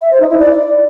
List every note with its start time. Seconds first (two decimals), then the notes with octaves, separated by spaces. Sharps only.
0.01 E5
0.11 C5
0.20 D#4
0.29 E4
0.39 D5